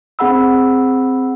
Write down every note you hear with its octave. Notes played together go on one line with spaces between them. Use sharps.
C4 G#4 F#5 B5 E6